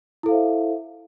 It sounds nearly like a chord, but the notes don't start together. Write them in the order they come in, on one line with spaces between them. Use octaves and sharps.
E4 A4 F5 C5 E5